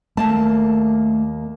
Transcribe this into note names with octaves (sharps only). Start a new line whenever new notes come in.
D#2 A3 A#3 A5